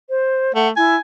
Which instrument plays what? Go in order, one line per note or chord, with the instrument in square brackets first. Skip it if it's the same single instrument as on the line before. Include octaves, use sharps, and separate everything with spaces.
[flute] C5
[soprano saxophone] A3 [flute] F#5
[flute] E4 [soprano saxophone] G#5